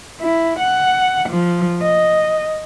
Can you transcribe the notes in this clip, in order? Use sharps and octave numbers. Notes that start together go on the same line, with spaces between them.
E4
F#5
F3
D#5